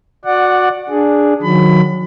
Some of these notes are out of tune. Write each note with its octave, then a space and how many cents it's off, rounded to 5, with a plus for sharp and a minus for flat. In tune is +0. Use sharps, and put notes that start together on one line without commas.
F#4 -20 D5 +10 F#5 +0
D4 +0 G#4 +0
D#3 -20 F#3 -30 B5 +25